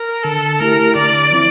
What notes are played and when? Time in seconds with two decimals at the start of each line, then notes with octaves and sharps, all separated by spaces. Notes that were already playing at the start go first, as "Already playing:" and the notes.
Already playing: A#4
0.23 D3 A4
0.60 A3 E4 G4 A#4
0.95 D3 D5
1.31 F3 C4 E4